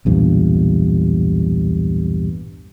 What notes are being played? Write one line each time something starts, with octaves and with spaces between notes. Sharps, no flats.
B1 E2 G2 A#2